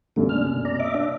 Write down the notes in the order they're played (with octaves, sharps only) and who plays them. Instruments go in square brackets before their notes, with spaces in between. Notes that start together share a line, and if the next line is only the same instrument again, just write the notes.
[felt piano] F#2 B2 A#3 [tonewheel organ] D3 G3 A3
[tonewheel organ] D4 F6
C3
D5 A#5
D#5 E5 D6
D4